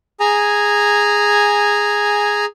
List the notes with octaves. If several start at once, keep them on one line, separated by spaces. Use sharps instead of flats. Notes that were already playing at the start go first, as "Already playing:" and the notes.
G#4 G#5 A#5